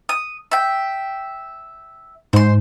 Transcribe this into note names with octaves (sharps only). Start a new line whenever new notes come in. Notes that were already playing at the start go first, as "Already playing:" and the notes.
D#6
E5 G5
G#2 C5 C6